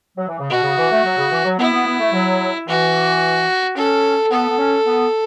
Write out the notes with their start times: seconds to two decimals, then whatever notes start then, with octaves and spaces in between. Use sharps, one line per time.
0.18 F#3
0.29 E3
0.39 C#3
0.50 B2 F#4
0.63 C#3
0.78 E3
0.91 A3
1.05 F#3
1.17 C#3
1.32 E3
1.45 F#3
1.59 B3 E4
1.73 B3
1.87 B3
2.00 A3
2.13 F#3
2.68 E3 F#4
3.77 C#4 A4
4.31 B3 A4
4.49 B3
4.58 C#4
4.86 B3